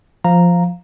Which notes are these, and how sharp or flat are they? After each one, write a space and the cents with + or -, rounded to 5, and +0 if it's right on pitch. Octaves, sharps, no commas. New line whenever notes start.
F3 +0 F5 +0 A#5 -5